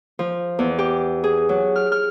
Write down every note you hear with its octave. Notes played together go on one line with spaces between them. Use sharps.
F3
E2
G4
G#4
F#3
F6
F6